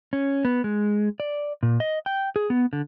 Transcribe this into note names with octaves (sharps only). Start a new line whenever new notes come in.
C#4
B3
G#3
D5
A#2
D#5
G5
G#4
B3
D3